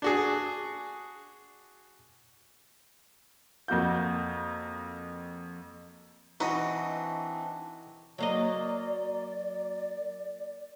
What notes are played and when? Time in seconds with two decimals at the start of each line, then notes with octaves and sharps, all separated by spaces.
0.02 D4 F#4 G#4
3.68 F2 A#3 F#4 G6
6.40 E3 C4 D4 D#4 F#4 B4 D#5
8.18 F#3 A#3 D5 D#5